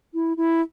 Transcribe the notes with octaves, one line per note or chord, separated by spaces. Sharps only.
E4
E4